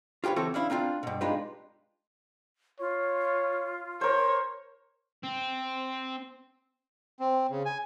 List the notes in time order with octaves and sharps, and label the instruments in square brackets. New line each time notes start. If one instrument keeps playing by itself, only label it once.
[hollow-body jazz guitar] F4 G4 G#4 B4 C#5
E3 C4 F#4 A4 C5 C#5
C#4 D4 E4 F5
A#3 C4 D4 F4
G2 B2
G#3 D4 D#4 F4 G4 B4
[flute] F4 [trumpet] C#5
[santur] A#4 C5 [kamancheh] C#5
[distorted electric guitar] C4
[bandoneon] C4
C#3
G#5